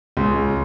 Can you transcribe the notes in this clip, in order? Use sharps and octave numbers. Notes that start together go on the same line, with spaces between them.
C#2